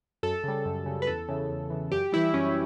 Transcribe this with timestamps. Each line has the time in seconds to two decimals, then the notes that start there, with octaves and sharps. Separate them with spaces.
0.23 F#2 A4
0.44 C#3 G3
0.66 F#2
0.86 C#3 G3
1.02 B4
1.07 E2 A4
1.29 C#3 E3
1.50 E2
1.70 C#3 E3
1.91 F#2 G4
2.12 E3 G3 E4
2.34 F#2 C#4